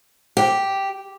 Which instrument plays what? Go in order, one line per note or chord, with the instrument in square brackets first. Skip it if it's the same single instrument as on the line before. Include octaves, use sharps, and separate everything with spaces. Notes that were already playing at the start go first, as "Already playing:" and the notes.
[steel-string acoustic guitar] G4